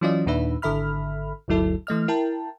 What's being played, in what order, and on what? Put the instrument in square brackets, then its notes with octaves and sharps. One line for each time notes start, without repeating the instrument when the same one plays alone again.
[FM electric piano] E3 F#3 C#4 F4 D5 D#5
D#2 A#2 D4 D#4 B4 E5
G#1 D3 A4 E5 B5 F6
G1 D2 F#3 E4 A4
E3 A3 D#5 F6
E4 A#4 G5 A5